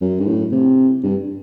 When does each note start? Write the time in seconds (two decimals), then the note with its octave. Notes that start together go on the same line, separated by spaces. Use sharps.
0.02 F#2
0.20 G2
0.27 A2
0.52 C3
1.03 G2